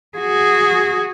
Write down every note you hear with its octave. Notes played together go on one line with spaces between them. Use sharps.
F#4 G#4